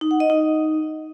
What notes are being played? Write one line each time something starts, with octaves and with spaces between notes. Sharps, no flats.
D#4
F#5
D#5
D#4